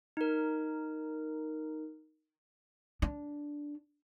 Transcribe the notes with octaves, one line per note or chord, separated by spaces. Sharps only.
D#4 A#4
D4